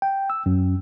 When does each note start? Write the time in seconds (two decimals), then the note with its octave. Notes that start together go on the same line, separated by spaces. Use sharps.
0.02 G5
0.30 E6
0.46 F#2